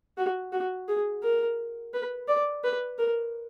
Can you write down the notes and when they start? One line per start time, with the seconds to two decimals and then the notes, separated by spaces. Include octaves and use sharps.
0.18 F#4
0.53 F#4
0.88 G#4
1.23 A#4
1.94 B4
2.28 D5
2.64 B4
2.99 A#4